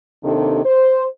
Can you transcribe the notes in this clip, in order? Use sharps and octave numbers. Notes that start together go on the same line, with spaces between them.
D#2 C3 D#3 D4 A4
C5